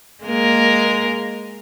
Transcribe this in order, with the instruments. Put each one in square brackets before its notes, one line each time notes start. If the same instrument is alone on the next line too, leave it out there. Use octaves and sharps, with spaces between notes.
[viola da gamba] G#3 A#3 A#4